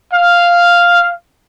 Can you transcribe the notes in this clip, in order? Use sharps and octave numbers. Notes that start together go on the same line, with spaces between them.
F5